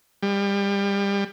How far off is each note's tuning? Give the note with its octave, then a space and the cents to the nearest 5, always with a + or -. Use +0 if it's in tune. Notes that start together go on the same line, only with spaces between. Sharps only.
G3 +30